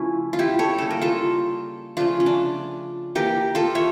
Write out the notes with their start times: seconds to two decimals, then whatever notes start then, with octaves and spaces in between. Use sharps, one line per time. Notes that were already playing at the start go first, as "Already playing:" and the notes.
Already playing: C#3 F3 A3 C#4 E4
0.33 F4
0.39 E4 G4
0.59 A4 C#5
0.78 C#3 G3 A#3 A4
0.91 A#4
1.02 F4 A4
1.97 C#3 F3 A3 D4 F4
2.20 C#4
2.26 D4
3.15 E3 A#3 G4 A#4
3.55 F4 A4
3.75 C#5 E5